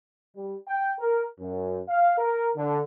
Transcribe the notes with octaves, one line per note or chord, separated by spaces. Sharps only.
G3
G5
A#4
F#2
F5
A#4
D3